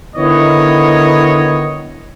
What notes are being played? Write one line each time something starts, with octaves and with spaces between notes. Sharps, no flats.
D3 D#3 B3 E4 C#5 D#5